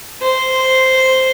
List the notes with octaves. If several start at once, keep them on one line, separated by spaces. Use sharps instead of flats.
C5